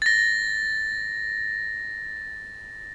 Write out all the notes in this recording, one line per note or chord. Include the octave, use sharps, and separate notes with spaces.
A6 A#6